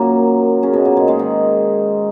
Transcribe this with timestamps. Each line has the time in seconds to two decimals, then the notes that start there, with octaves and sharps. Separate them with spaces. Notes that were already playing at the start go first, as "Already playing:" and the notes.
Already playing: F#2 A#2 F#3 A#3
0.63 C#3 C#4
0.73 B2 B3
0.85 A#2 A#3
0.97 G#2 G#3
1.08 G#2 G#3
1.19 D#3 D#4